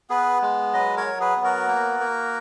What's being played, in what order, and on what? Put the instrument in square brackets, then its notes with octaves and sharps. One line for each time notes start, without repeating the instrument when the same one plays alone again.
[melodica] B3 G#4 B4
G#3
F#3 B4 D#5
A#4 C#5
F#3
G#4 B4
B3
F#4 A#4
A#3
A#3